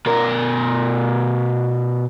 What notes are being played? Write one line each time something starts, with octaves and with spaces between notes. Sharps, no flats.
B2 A#4